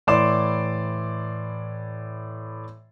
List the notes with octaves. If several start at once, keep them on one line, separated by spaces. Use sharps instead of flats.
A2 E3 D5 C6 D6 E7